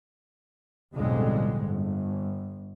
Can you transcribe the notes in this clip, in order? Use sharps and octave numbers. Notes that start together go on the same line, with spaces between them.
B1 F2 A2 D3 G3 G#3
G1